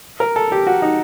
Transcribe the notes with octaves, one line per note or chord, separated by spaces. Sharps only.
A#4
A4
G4
F#4
D#4